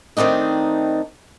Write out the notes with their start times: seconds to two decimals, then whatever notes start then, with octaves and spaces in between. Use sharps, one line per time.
0.17 D#3 A3 C4 D4 D#4